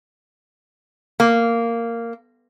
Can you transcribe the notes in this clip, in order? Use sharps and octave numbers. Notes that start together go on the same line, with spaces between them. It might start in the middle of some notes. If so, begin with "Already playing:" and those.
A#3